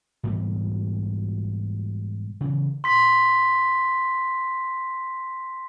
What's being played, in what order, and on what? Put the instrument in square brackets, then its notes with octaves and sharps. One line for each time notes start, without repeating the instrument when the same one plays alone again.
[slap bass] G#2 B2 E3 G3
C#3 E3
[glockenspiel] C6 B6